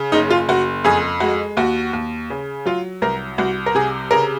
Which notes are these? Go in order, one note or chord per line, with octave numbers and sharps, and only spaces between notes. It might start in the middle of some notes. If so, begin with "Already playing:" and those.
Already playing: C#3
F#1 D#4
F4
F#1 F#4
F2 G#4
G#3 F#4
D#2 F#4
D#2
C#3
F#3 F4
C2 A#4
C2 F#4
A#4
C3 G#4
C#3 A#4